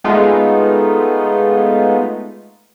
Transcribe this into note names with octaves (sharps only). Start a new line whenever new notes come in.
G#3 A3 B3 D#4 F4